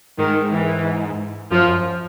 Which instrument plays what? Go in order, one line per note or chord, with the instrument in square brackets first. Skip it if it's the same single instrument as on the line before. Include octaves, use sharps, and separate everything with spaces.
[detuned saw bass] G#2 [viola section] D#3
[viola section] E3
[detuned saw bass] F#2 [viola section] F3
[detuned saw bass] F#2